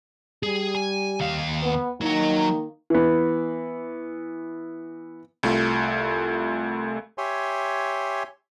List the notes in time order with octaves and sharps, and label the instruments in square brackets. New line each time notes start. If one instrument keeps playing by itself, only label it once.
[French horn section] G3 [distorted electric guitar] G#4
[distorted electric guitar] G#5
D#2 F5
[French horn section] B3
[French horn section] D#3 A#3 D#4 [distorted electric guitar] F#3 F#4
[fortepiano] E3 B3
[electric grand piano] C2 A3 F4
[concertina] G4 C#5 E5 G#5 C6